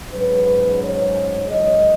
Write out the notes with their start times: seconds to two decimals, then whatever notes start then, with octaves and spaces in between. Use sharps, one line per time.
0.13 G#2 F#3 C#4 B4
0.81 C#5
1.49 F#2 E3 G#3 D#5